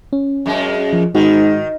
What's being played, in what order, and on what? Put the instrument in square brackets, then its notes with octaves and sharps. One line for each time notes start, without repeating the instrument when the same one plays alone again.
[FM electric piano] C#4
[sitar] F#2 G#3
[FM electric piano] F3
[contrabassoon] G#2 [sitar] D#3 [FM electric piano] F#4